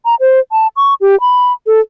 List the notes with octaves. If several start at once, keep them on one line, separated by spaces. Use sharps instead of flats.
A#5
C5
A5
C#6
G4
B5
A4